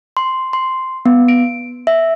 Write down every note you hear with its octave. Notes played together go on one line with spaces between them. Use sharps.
C6
C6
B3
D7
E5